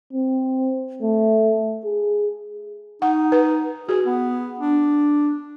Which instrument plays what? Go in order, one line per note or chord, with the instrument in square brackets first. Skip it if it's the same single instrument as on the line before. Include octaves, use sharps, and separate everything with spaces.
[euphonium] C4
A3
G#4
[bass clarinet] D#4 [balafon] F#5
[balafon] B4
[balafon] F#4 [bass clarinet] G#4
[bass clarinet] B3
D4